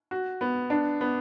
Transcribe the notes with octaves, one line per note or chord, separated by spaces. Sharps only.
F#4
B3
D4
B3